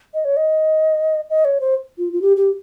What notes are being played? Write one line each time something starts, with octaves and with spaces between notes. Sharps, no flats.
D#5
C#5
D#5
D#5
C#5
C5
F4
F4
G4
G4